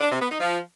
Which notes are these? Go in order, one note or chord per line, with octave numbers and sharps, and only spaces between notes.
D4
C3
B3
D#4
F3